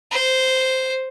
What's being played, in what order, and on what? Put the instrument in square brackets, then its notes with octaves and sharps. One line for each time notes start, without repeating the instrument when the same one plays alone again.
[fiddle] C5